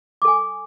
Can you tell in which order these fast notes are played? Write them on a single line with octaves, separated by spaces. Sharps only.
D6 A4 G#5